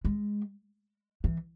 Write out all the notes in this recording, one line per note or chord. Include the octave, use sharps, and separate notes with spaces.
G#3
E3